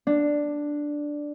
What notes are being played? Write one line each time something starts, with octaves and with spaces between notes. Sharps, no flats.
D4